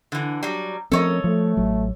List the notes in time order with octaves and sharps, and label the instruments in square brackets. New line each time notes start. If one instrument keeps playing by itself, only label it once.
[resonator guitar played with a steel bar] D3 E3
F#3 G3
[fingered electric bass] F3 C4 [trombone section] A3 C#4 A#4 [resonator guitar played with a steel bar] A4 C#5 D#5
[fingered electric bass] F3 [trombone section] A3
[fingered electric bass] A1 F#3